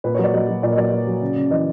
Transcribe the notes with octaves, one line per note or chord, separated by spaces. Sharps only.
A#2 B4
C#5
F#3 D5
F#3 D#5
F#3
A#2 D5
D#5
F#3 D5
F#3
F#3
C#3
C#3
E3 D#5